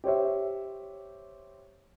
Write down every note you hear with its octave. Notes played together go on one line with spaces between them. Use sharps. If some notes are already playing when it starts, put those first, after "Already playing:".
G4 C5 C#5 E5